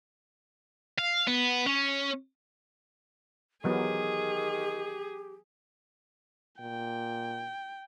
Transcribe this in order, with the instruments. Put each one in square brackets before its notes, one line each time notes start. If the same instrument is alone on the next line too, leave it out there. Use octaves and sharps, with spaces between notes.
[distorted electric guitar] F5
B3
C#4
[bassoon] D#3 [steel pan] E3 F#3 B3 [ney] G4 [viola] G#4
[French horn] A#2 [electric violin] G5